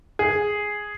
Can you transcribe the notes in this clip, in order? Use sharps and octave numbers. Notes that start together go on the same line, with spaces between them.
G#4